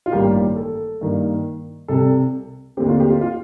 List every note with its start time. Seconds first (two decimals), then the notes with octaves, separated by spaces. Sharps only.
0.06 F4
0.12 A1 G2 D#3 G3 A#3 G4
0.56 A4
1.01 G2 D#3 A#3
1.88 C2 C3 G3 A4
2.77 D#2 D3 A3 C4 G4
2.88 F4
3.00 G4
3.10 F4
3.21 F4